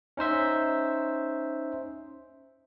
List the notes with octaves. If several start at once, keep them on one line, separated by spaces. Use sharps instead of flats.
C#4 D#4 C5 E5